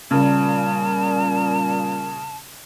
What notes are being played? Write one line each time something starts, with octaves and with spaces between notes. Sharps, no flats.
A#2 C#3 G3 A5